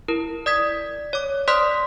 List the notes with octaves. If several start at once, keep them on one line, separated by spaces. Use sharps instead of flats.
E4 A#4
D5 D#6 G#6 B6
C#5 D6
C5 D5 C6 D#6 F#6 B6